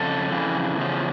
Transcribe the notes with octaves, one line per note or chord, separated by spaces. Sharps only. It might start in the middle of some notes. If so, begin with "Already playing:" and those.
Already playing: F2 C#3 A4
F2 C#3 E3
E2 C#3 F3